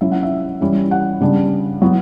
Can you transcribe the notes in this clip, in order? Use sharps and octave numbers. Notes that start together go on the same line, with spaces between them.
F#3 C#4 E4 E5
F#5
E5
E3 G3 C#4 E4
F#5
C#3 G3 B3 D4
F#3 B3 E4